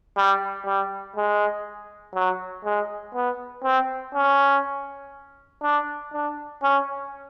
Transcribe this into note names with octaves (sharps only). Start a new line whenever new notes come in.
G3
G3
G#3
F#3
G#3
B3
C4
C#4
D4
D4
C#4